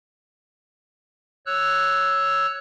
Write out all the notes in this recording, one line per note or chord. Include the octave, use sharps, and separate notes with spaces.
C#5 E6 F#6